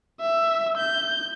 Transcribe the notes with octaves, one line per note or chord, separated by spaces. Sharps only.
E5
G6